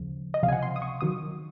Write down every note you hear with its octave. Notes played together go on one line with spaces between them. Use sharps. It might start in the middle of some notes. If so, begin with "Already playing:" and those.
Already playing: D#2 C#3 F3
D#5
C#2 C3 F3 F5
G#5
F#5
C6
D#6
C#6
D#3 F#3 D#6